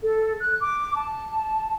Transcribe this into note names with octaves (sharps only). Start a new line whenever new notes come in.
A4
F#6
D6
A5